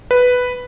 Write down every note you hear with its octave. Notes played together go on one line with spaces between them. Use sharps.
B4